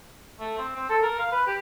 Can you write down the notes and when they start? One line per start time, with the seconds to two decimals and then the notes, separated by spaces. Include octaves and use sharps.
0.40 A3
0.58 C4
0.76 C4
0.90 A4
1.03 A#4
1.19 F5
1.32 B4
1.47 G4